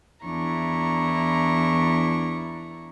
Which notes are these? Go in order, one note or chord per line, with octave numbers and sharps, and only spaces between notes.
E2 D4 E4 A#5 C#6